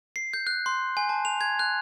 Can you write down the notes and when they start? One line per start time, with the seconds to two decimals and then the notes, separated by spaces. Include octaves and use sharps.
0.16 C7
0.33 G6
0.47 F#6
0.66 C6
0.97 G#5
1.09 A5
1.25 F7
1.41 G#6
1.59 F#6